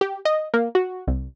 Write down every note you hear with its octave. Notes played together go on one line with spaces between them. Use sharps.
G4
D#5
A#3
F#4
C2